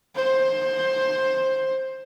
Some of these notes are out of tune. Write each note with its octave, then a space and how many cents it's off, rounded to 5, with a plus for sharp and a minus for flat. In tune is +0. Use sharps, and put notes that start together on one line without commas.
C5 +15